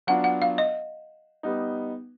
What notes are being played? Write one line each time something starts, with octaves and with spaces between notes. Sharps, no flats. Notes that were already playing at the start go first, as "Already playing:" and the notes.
F#3 B3 D4 F4 F#5
F#5
F5
D#5
G3 B3 D#4